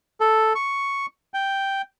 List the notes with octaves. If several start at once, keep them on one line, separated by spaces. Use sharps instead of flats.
A4
C#6
G5